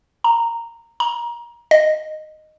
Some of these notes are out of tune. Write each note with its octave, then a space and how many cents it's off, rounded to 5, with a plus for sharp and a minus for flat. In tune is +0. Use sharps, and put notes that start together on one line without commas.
A#5 -10
A#5 +25
D#5 -10